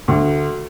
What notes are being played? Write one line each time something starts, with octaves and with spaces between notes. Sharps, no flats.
D2